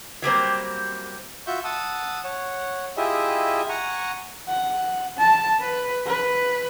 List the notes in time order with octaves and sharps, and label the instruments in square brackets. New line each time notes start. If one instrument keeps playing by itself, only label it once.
[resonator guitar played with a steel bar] F#3 G3 A#3 C4
[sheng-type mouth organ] F4 F#4 E5 C#6 G6
F#5 A5 D#6 E6
C#5 F#5
E4 F4 G4 G#4 D#5 E5
F#5 G#5 A#5 C#6
[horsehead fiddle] F#5
A5
B4
B4